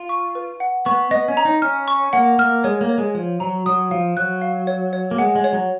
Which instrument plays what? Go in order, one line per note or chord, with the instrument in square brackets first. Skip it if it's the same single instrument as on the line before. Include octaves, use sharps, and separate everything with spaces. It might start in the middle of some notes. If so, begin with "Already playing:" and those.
Already playing: [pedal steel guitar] F4
[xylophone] C#6
B4
F#5
[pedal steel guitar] B3 [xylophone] C#6
[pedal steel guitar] B3 [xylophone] D#5
[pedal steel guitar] C#4
[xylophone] A#5
[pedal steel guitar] D#4
[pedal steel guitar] C#4 [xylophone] F6
[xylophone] C#6
[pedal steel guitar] A#3 [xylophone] F#5
[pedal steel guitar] A#3 [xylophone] F6
[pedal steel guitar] G#3 [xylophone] C#5
[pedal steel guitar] A#3
[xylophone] C#5
[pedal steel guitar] G#3
[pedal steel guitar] F3 [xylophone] C#5
[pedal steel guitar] F#3 [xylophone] A#5
[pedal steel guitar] F#3 [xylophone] D#6
[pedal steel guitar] F3 [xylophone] F5
[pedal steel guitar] F#3 [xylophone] F#6
[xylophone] F5
C#5
C#5
[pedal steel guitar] A#3
[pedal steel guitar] G#3 [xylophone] F#5
[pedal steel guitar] G#3
[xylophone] C#5
[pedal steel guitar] F#3